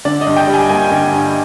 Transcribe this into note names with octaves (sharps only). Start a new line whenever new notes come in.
D3 D5
D#5
G2
G5
G3
G#5
A#3 G#5
D3
G2